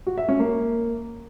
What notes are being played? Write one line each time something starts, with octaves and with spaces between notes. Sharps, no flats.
F#4
E5
C#4
A#3